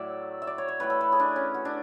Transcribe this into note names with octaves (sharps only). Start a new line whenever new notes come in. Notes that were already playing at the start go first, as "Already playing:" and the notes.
Already playing: A2 F#3 A3 D5 E5
E5
D5
C#5
C#5
A2 E3 A3 B4
A4
B4
G#4
D4
C#4
F#4
D4